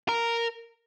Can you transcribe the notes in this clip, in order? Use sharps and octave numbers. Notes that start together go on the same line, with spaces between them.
A#4